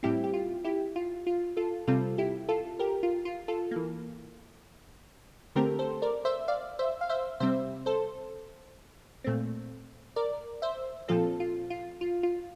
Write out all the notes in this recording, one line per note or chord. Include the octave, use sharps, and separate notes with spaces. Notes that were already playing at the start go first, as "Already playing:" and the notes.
A2 G3 C4 E4 G4
G4
F4
E4 G4
F4
F4
F4 A4
C3 G3 C4 F4 A4
E4 G4
F4 A4
G4 A#4
F4
F4
F4 A4
E3 A#3
D3 A3 C4 G4 A#4
A4 C5
A#4 D5
C5 E5
D5 F5
C5 E5
F5
C5 E5
C3 G3 C4 C5 E5
A4 C5
A#2 A3 C4
A#4 D5
C5 E5
A#2 F3 C4 F4 A4
F4
F4
F4
F4